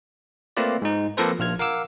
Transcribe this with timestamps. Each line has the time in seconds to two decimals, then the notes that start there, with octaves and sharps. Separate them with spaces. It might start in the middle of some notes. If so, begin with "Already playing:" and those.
0.57 A3 A#3 C4 F4 B4 D5
0.82 G#2 D#4
1.17 F3 A#3 C4 A4 B4 C5
1.39 A#1 F4 F6 G#6
1.59 A#4 F5 F#5 D6 E6